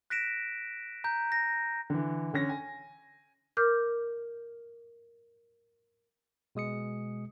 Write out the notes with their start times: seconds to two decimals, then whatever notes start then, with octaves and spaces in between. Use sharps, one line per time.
0.10 F#6 A#6 B6 D7 E7
1.04 A#5 G6
1.32 A#6
1.90 D3 E3
2.34 D3 C#4 A#6
2.49 G#5
3.57 A#4 D6 F6 G6
6.55 B2 G#3 D#6 C#7